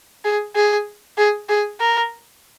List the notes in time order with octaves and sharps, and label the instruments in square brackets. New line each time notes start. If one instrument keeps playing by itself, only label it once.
[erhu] G#4
G#4
G#4
G#4
A#4